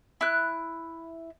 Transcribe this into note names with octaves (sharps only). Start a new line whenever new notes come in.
E4 F#6